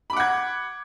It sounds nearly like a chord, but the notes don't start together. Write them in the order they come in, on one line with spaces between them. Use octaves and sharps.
B5 D6 F#5 G#6